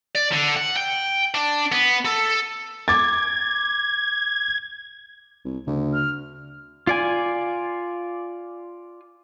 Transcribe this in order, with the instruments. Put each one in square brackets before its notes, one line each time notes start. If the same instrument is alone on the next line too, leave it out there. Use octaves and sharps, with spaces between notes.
[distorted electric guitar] D5
D3
F#5
G5
D4
B3
A4
[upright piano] D6 A6 [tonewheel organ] G#6
[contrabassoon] C2
[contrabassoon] D2 [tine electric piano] C#3
[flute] F6
[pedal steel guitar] F4 D5 G#5